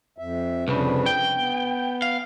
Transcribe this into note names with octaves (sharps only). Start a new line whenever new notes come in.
F2 E5
C2 F2 C#3 D4 B4
G5
B3
F5